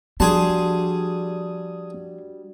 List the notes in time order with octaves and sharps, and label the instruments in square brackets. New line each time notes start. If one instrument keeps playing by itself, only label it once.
[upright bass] F3 [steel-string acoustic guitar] G3 [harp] D4 F#4 C6 [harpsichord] G#4 A5